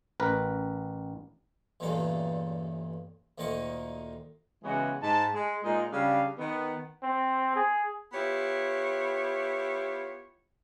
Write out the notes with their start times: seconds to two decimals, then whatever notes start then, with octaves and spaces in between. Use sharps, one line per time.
0.20 A1 A#4 B4
1.80 A1 E2 G2 A#2 C#3 A4
3.38 D2 A#2 D#3 A#3 D#5 C#6
4.64 C#3 E3 G#3 B3 F#4 C#5
5.02 G#2 D#4 A5
5.34 G#3
5.63 A#2 G#3 D#4
5.92 C#3 G3 D4 F5
6.38 D#3 B3
7.03 C4
7.56 G#4
8.13 B3 E4 F4 G4 C#5